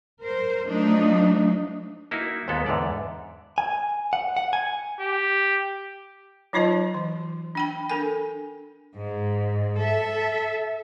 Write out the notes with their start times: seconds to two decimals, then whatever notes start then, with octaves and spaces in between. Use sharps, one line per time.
0.21 A#4 C5
0.66 F3 F#3 A3 D4 D#4
2.11 A#3 D#4 E4 F#4
2.48 D#2 G#2 G#3 B3 A4
2.66 E2 G#2 D3 D5
3.58 G#5
4.13 F#5
4.37 F#5
4.53 G#5
4.99 G4
6.53 F#3 D#4 F4 C5 D#5 A5
6.94 E3
7.55 D4 G5 B5
7.90 D4 A4 A#4 G#5
8.96 G#2
9.78 A4 E5